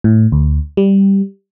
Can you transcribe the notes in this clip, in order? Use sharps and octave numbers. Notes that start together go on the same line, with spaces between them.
A2
D2
G3